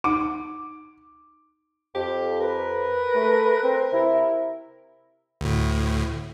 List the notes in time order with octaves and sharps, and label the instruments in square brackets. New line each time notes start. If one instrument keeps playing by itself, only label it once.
[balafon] D#4 F#5 [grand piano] D6
[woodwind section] F2 [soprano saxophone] G4
[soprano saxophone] A#4 [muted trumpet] B4
[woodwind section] A3
C4
C3 E4
[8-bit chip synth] D2 A2